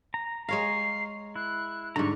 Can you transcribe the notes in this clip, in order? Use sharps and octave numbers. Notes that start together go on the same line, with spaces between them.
A#5
G#3 C#5 F5 A#5 C7
E4 F#6
G#2 D3 G3 A#5 C#6